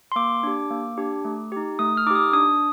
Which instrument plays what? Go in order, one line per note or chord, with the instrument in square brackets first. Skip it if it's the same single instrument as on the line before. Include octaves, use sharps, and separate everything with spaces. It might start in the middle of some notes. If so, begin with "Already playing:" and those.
[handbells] C6
A#3 D6
D4 G4
A#3
D4 G4
A3
D#4 G4
A3 D#6
F6
D#4 G4 D6
D#6
D4 D#6